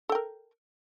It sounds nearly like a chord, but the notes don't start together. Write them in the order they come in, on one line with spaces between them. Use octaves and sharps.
A4 G5 A#4